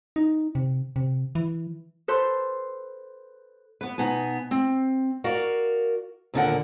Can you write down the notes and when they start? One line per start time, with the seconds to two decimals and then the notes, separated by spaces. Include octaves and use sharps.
0.16 D#4
0.55 C3
0.96 C3
1.35 E3
2.08 A4 B4 C5 C6
3.81 B3 B4
3.98 B2 B3 D#4 G#5
4.51 C4
5.24 F#4 A#4 D5 F5
6.34 D#2 A#2 D3 D4 A#4 F#5